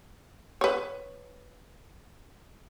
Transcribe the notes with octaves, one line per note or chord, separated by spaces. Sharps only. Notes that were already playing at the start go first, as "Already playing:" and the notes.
B4 C#5